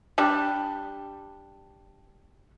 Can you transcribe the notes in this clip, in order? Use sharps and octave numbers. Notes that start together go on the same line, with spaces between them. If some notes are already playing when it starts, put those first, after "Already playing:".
G3 D4 G4